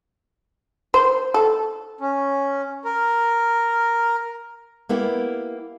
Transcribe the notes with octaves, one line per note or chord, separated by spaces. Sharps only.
C5
A4
C#4
A#4
A#3 B3 E4 G4